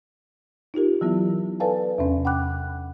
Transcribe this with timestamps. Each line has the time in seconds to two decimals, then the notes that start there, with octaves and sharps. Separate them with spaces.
0.74 D#4 F4 G4 A#4
1.01 E3 F#3 B3 E4
1.60 A4 B4 D5 F5 G#5 A5
1.98 E2 C3 C#4
2.25 F#5 G5 B5 D6 F#6